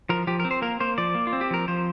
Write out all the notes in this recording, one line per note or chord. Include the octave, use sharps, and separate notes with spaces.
F3 A#4
F3 G4
A#4
C4
C5
A#3 A#4
A#3 C5
F3 D5
A#3
F4
C4
G4
F3 A#4
F3 C5